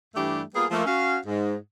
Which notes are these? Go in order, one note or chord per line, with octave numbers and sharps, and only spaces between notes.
G2 E3 G3 A3 D4 G4
G3 A#3 B3 F4 G#4
F3 A3 A#3
C#4 F#4 F5
G#2